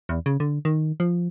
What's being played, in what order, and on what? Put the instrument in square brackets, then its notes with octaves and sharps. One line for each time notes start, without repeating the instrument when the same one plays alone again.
[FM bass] E2
C#3
D3
D#3
F3